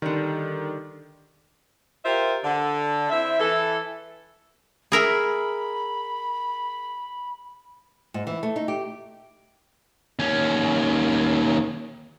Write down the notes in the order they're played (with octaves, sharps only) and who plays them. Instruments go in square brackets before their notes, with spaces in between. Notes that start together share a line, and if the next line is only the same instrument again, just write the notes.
[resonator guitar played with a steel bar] D3 G3 [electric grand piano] D#3
[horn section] F4 G4 A#4 C5 E5
D3
C4 E4 E5
E3 A4
[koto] G#4 A#4 E5 [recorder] B5
[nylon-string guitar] G#2
E3
A3
D#4
G4
[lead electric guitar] D#2 C#4